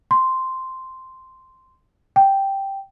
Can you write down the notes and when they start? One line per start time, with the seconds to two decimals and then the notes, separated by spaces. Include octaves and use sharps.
0.11 C6
2.16 G5